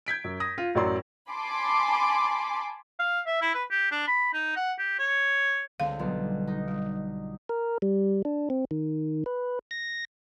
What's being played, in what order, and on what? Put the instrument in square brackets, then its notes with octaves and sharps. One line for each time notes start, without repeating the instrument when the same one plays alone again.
[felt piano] G6 G#6 B6 D7
F#2
D#6 A#6
F4
A1 F#2 F#3 C#5 D5 C6
[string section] G#5 A5 B5 C6 D6
[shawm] F5
E5
E4
B4
G4
D4
B5
D#4
F#5
G4
C#5
[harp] C#2 D3 C4 [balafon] F5
[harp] B1 G3 F4
D#4
[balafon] G3
[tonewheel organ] A#4
G3
D4
C4
D#3
B4
A#6